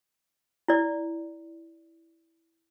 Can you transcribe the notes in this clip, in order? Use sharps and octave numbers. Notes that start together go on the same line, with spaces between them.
E4 D5